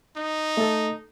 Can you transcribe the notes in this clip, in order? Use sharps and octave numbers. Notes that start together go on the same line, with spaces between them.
D#4
A3 A4